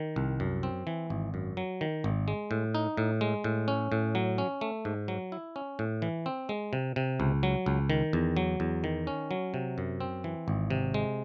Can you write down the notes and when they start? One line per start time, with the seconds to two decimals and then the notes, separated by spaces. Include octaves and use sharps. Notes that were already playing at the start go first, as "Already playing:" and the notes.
Already playing: D#3
0.16 C2
0.40 F#2
0.63 C4
0.87 E3
1.10 G#1
1.34 F#2
1.57 F#3
1.81 D#3
2.04 G#1
2.28 G#3
2.51 A2
2.75 D#4
2.97 A2
3.21 G#3
3.44 A2
3.68 C#4
3.92 A2
4.15 F#3
4.38 C#4
4.61 A3
4.85 G#2
5.08 F#3
5.32 E4
5.56 C#4
5.79 A2
6.02 E3
6.26 C4
6.49 G#3
6.73 C3
6.96 C3
7.20 C#2
7.43 F#3
7.66 C#2
7.90 D#3
8.13 E2
8.37 F#3
8.60 E2
8.84 D#3
9.07 C#4
9.31 F#3
9.54 C3
9.78 F#2
10.01 C4
10.24 E3
10.48 G#1
10.70 C3
10.94 G#3